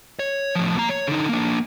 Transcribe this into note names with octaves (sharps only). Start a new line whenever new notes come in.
C#5
A2 F3
A#3 A#5
C#5
D3 D#4
A#3 D4